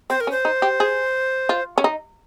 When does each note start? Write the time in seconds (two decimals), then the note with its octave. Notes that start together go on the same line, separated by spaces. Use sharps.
0.10 C4 C5
0.20 A#4
0.27 C#4
0.31 C5
0.45 D#4
0.62 G4
0.80 G#4
1.49 F4
1.78 C#4
1.84 D#4